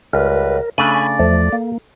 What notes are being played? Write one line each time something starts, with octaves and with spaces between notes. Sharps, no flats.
C#2 G3 A#4 B4
C#3 A3 D4 D5 G#5 B5
E2 F3 A3 A4
A#3